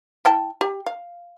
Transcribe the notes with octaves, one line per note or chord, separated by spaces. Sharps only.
E4 G5 A5
G4
F5